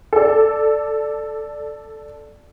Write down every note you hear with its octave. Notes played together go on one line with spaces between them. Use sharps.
A4 D5